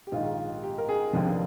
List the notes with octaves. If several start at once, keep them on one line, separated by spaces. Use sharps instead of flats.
G4
A#1 G#2 D#3 F4
G4
A#4
G#4
F1 D#2 D3 F3